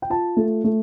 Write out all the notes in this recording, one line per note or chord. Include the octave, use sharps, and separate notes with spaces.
G5
F4 A5
A3
A3